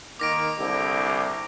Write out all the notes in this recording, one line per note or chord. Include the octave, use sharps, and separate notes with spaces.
D#3 A#3 D6 A#6 D7
C2 D3 E4 G4